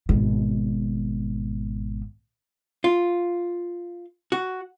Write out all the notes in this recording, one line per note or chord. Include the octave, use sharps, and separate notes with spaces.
G#1 B2
F4
F#4